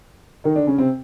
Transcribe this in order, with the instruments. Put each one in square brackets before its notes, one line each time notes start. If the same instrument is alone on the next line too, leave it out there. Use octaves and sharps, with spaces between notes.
[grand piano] D#3 D#4
D3 D4
C#3 C#4
C3 C4